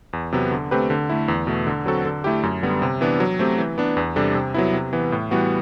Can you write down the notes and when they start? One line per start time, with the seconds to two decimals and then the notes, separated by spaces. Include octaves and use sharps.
0.13 E2
0.32 C3 F#3 B3
0.51 D3
0.71 A3 C4 G4 B4
0.90 D3
1.09 A3 E4
1.28 E2
1.47 B2 A3
1.67 D3
1.86 F#3 C4 F#4 A4
2.05 D3
2.24 A3 E4 G4
2.43 F#2
2.62 D3 G3 B3
2.82 C3
3.01 E3 B3 D4
3.20 F#3
3.39 A3 C4 G4
3.58 E3
3.78 B3 D4
3.97 E2
4.16 C3 G3 D4 A4
4.35 C3
4.54 F#3 B3 E4
4.73 C3
4.93 E3 B3
5.12 A2
5.31 E3 G3 B3 F#4